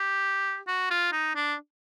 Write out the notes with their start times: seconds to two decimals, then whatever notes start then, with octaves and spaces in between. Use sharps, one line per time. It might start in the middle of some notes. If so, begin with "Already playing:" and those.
Already playing: G4
0.68 F#4
0.91 F4
1.12 D#4
1.35 D4